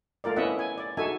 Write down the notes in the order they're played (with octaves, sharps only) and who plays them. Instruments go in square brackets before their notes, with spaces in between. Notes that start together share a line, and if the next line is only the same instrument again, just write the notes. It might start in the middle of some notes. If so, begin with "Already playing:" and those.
[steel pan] A3 F4 A#4 D5
B3 C#4 E4 D#5 E5 F#5
G#5
D5
D#4 F#4 G#4 A4 E5 G#5